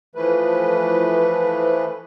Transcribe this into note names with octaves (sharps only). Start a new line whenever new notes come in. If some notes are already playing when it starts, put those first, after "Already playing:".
E3 F3 A3 B4